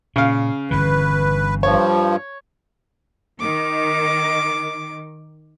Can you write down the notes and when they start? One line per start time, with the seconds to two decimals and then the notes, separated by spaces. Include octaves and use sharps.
0.16 A#2 C#3 F5
0.71 G1 D3 E3 B4
1.63 G2 F3 C#5
3.40 D#3 D6